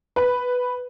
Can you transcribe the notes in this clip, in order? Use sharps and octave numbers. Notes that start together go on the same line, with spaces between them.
B4